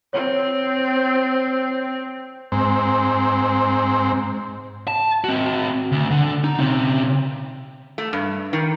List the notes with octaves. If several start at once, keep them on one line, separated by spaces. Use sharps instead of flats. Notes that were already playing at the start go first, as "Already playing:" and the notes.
C4 C#5
G#2 C4
A5
C4 F#4
D2
D3
D#4
C#3 C4
A3
G2
D#3